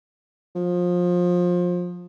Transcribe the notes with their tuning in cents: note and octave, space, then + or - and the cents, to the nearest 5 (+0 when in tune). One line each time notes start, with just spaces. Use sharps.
F3 +25